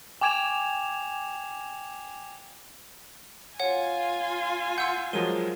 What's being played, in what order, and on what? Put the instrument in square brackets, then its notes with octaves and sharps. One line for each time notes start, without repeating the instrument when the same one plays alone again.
[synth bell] G5 G#5 D6 G#6 E7 F7
[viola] F4 G#5 [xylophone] C#5 F#5
[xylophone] F#5 E6 [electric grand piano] C6 G6
[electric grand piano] F3 F#3 G#3 [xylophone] A#4 D#7